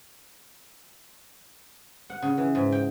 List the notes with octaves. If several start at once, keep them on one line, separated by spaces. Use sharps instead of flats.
F#5
C#3
E3
G#2
G5